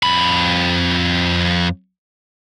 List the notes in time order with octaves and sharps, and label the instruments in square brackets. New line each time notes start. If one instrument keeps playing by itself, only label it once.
[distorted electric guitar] F2 B5